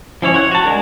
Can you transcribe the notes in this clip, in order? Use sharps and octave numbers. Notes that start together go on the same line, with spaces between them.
F3 C#4 E4 C#5
C#5 F#5
F#4 A5
G#3 D4 G#4 A#4